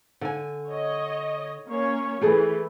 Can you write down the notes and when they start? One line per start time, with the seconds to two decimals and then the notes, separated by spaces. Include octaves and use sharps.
0.21 D3 G#5
0.69 C#5 D#5
1.67 A#3 C#4 C#5
2.21 E3 A3 G#4 A4